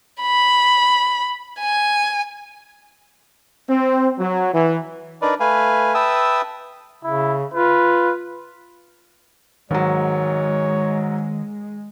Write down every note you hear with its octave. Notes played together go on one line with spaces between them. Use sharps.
B5
G#5
C4
F#3
E3
D4 D#4 A#4 B4 D5
A3 B4 F5 G#5
B4 E5 G5 A5 D#6 E6
C#3 E4
F4 B4
G#2 D#3 F#3 G#3 C#5